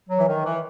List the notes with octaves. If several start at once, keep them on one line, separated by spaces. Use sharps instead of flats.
F#3
E3
D#3
E3